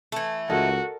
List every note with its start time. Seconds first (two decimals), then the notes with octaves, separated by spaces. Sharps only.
0.12 E3 A3
0.50 C#2 F#4 A4 A#4 D#5